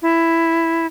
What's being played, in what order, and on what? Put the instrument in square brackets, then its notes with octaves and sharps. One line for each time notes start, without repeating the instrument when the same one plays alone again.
[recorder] E4